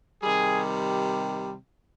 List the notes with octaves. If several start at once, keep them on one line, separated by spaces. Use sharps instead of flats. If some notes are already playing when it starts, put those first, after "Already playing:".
C3 D#3 G3 G#4